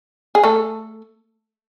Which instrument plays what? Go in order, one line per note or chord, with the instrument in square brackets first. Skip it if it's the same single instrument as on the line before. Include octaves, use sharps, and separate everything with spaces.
[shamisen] G#4
A3 A4